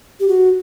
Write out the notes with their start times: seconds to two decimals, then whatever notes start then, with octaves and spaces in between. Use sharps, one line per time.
0.20 G4
0.28 F#4